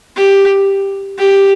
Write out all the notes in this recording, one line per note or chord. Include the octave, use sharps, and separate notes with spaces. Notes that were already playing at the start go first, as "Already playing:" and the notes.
G4
G4